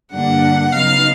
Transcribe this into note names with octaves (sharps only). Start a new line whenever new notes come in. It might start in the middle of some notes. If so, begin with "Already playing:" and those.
G2 D3 G3 A#3 D4 F#5
C#3 F#3 B3 D#4 F5